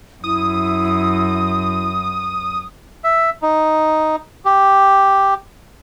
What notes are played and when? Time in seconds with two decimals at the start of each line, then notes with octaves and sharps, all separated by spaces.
0.24 F#2 E4 D#6
3.04 E5
3.42 D#4
4.45 G4